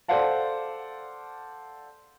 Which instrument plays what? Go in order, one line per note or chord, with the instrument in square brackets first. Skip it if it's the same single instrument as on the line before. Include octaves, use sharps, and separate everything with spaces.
[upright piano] A4 C5 D5 F5 F#5 A5